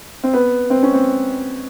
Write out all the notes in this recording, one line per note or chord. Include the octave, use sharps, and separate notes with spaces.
C4
B3
C4
C#4
C4